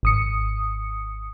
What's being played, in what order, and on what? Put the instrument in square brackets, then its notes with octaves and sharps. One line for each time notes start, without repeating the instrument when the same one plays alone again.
[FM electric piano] G#1 D#6 C#7